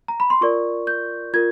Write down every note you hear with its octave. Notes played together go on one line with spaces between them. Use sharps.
A#5
B5
C6
F4 A#4 D5 C#6
G6
F4 A#4 G#6